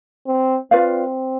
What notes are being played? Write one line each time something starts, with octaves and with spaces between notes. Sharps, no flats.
C4
C4 F4 B4 D5 F5